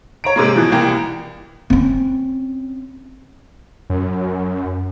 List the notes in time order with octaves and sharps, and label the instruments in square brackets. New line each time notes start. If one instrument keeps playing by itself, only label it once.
[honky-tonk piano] C#5 A#5 D7
G#2 C3 G#3 A#3
B2 E3 F3
C2 E3 A#3 G5
[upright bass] C4 C#4
[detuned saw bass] F#2